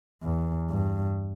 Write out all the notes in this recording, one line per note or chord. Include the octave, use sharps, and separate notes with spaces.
E2
G2